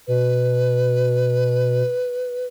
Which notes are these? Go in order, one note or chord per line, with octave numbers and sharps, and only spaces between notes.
B2 B4